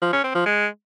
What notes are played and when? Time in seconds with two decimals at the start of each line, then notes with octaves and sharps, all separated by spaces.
0.02 F3
0.13 C#4
0.24 C4
0.35 F3
0.46 G#3